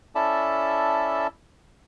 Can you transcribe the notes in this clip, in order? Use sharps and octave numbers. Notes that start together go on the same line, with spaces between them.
C#4 E4 A4 D5 E5 A5